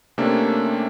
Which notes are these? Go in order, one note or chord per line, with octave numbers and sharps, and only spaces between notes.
C3 A3 A#3 C#4 D4